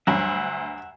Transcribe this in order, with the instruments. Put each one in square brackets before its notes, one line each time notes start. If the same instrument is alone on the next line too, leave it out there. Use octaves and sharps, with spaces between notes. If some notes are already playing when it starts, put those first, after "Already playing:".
[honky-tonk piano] D2 [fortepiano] G2 F#3 [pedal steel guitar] E5 F#5